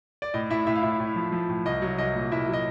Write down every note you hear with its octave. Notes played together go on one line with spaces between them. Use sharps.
D5
A2 D#5
A2 E4 E5
A2 E4 E5
F5
A2 E4 E5
A2
F3
F3
A2
C2 D#5
F#3
C2 D#5
A#2
C2 E4 E5
F#3
D#5